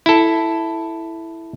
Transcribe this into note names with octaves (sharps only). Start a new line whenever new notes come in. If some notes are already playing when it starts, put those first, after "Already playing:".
E4 A4